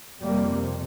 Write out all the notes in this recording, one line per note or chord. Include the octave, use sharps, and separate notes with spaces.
F2 C3 G3 A#3